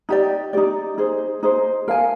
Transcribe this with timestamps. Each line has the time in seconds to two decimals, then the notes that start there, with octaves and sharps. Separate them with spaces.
0.09 D#4 G4 D5
0.53 D#4 G4 D5
0.98 D#4 G#4 C5
1.43 D#4 G#4 C5
1.88 A#4 F5 G#5